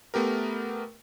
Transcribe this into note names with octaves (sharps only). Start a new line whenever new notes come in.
A3 B3 G4 A#4